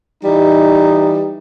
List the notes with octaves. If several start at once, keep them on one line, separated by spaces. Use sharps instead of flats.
E3 G3 D#4